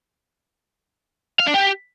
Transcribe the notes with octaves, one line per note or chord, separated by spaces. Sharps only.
F5
D4
G4